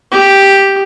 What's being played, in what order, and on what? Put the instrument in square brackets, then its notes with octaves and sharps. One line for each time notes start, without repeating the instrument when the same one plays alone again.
[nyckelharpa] G4